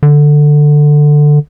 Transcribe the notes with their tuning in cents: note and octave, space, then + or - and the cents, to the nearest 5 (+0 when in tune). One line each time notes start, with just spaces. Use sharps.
D3 +10